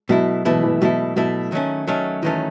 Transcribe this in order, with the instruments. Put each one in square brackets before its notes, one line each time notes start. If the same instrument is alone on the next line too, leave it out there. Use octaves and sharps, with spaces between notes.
[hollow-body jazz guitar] B2 A3 E4 [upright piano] F#3
[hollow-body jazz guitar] B2 A3 E4 [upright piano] E3
[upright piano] E3
[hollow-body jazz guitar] B2 A3 E4 [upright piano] F#3
[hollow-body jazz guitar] B2 A3 E4 [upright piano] F#3
[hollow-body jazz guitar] D#3 F#3 A3 C#4
D#3 F#3 A3 C#4
[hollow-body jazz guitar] D#3 F#3 A3 C#4 [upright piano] E3